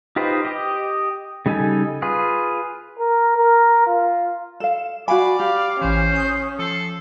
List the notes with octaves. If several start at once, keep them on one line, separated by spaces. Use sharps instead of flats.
D#4 F4 G4 B4 C5
G4 D#5
C#3 G3 D#4 A4 G#5
F4 G#4 B4
A#4
A#4
F4
A4 F5 E7
F#4 D5 F5 G#5 B5
G4 F5
A1 E3 C#4 C5
D#6 G6
F3 A4 C7